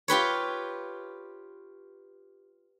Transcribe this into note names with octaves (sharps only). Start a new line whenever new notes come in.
F4 G4 B4 C#5